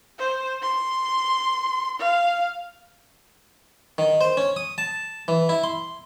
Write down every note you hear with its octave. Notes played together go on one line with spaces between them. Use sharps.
C5
C6
F5
D#3
C5
C#4
D#6
A5
E3
E4
C6